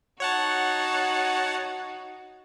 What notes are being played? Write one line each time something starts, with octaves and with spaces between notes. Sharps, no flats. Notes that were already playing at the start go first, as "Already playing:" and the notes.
D#4 F#4 C#5 F#5 A5